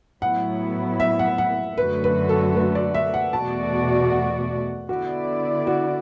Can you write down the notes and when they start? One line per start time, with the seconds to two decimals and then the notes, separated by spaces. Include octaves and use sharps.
0.22 A2 F#3 B3 E4 F#5
1.00 E5
1.19 F#5
1.38 F#5
1.78 F#2 D3 F#3 A3 F#4 B4
2.04 B4
2.29 A4
2.55 B4
2.75 D5
2.94 E5
3.14 F#5
3.33 E2 B2 A3 F#4 D5 A5
4.11 F#5
4.89 D3 B3 E4 F#4 D5
5.67 F#4